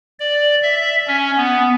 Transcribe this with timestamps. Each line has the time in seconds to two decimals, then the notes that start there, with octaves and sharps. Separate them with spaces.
0.19 D5
0.62 E5
1.07 C#4
1.37 B3